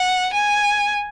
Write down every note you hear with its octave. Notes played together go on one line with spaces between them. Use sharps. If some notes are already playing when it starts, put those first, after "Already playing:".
Already playing: F#5
G#5